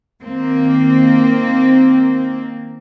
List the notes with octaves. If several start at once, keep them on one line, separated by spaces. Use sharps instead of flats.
D#3 A#3 C4